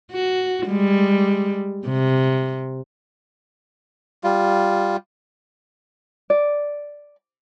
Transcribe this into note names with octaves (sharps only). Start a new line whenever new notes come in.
F#4
G3 G#3
C3
G3 F4
D5